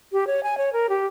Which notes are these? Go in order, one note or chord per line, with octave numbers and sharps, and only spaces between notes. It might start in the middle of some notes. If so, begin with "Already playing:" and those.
G4
C#5
G#5
C#5
A#4
G4